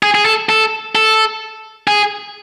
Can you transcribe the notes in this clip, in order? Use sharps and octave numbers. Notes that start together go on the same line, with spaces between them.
G#4
G#4
A4
A4
A4
G#4